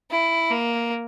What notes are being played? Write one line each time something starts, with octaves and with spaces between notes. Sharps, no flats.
E4
A#3